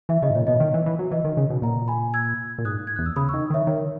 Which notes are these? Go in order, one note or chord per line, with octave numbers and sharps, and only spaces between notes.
E3 E5
C#3 D#5
G#2
A#2 C#5
B2 D#5
D#3
E3
E3
F#3
E3 D#5
D#3
C#3
B2
A#2 F#5 A#5
G#5 B5
E6 G#6
A#2
G#2 D#6 F#6
G#6
E2 F#6
E6
C#3 B5 D#6
C#6 E6
D#3
D#3 C#5 E5
D#3 C#5